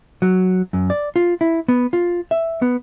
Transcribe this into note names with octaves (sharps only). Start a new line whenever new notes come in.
F#3
F#2
D5
F4
E4
B3
F4
E5
B3